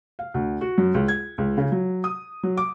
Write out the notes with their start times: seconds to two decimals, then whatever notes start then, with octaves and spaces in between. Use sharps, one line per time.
0.19 F5
0.34 D2
0.61 F#4
0.78 F#2
0.94 C#2
1.08 G#6
1.38 C#2
1.58 C#3
1.72 F#3
2.04 D#6
2.43 F#3
2.57 D6